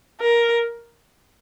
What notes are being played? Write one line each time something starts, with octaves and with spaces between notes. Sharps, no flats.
A#4